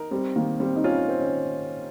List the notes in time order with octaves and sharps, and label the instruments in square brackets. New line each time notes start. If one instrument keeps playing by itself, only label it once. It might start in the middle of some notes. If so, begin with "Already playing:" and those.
Already playing: [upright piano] D#4 A#4
[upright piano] G3 [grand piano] C4
[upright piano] D#3 [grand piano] A#3
[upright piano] G3 [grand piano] C4
[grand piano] D#4
[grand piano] C#4 [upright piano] F4
[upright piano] C4
[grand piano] C#4